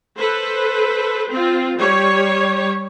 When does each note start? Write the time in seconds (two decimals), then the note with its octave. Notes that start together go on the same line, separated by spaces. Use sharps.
0.18 A4 B4 C5
1.29 C4 F4
1.78 G3 C#5